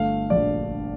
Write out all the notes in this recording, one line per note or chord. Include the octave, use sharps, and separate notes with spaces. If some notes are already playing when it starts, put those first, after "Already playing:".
Already playing: G1 A3 F5
A#1 D5